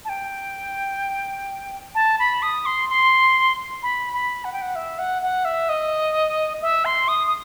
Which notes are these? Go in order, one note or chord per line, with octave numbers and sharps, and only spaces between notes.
A5
G5
A5
B5
D#6
C6
C6
B5
B5
F#5
G5
F#5
E5
F#5
F#5
E5
D#5
E5
C6
D#6
D#6